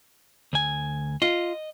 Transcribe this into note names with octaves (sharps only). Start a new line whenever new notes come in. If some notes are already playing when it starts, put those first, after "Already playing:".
D2 G#5
F4 D#5